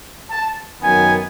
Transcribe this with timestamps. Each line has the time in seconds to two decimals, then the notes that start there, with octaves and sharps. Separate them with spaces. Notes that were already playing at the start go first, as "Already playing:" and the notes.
0.31 A5
0.82 F#2 D#3 F#3 B3 G#5